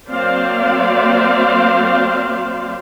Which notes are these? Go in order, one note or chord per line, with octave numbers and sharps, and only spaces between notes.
F#3 A#3 C4 C5 D5 F5